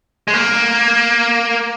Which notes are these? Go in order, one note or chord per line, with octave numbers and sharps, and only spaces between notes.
G#3
A#3